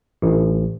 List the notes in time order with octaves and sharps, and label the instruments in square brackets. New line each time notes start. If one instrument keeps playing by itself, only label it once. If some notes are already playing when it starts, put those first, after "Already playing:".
[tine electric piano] A1